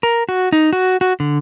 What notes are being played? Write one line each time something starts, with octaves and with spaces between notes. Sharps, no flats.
A#4
F#4
D#4
F#4
F#4
D3